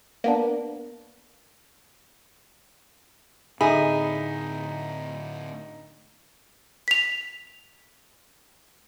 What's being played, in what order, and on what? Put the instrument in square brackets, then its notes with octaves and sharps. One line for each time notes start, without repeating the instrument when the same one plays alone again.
[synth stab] A#3 B3 D4
[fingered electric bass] A2 D3 [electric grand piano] D#4 E5 B5 [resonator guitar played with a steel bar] G#4
[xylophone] B6 F7